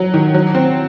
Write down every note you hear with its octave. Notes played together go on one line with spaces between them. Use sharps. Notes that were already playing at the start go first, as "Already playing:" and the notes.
Already playing: F#3
D#3
F#3
C4